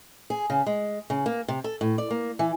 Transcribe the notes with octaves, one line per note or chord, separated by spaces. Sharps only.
G#4
C#3
G#3
C#3
A#3
C3
A4
A2
D5
A#3
E3